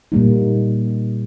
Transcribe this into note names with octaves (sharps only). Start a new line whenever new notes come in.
A#2 G3 A#3 D#4